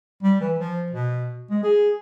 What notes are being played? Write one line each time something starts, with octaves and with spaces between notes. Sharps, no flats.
G3
E3
F3
B2
G#3
G#4